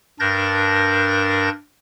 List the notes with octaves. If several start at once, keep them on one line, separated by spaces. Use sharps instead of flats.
G2 D4 A#4 G6 A6 A#6